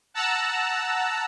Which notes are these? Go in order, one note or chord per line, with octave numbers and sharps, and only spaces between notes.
F#5 A5 A#5 E6 F#6